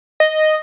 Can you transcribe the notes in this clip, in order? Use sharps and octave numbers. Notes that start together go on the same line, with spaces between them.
D#5